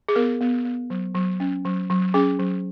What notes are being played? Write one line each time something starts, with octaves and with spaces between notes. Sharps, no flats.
G#4
B3 A#4
B3
B3
F#3
F#3
C#4
F#3
F#3
C#4 G#4
F#3